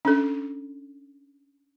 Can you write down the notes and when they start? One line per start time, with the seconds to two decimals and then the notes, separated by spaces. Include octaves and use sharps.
0.05 C#4 D4 A4